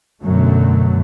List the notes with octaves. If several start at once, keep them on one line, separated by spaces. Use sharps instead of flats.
F#2 B2 D3 F#3 A3